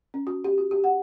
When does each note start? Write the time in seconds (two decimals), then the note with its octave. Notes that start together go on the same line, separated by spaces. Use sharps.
0.14 C#4
0.27 F#4
0.44 G4
0.58 F#4
0.71 G4
0.84 F#5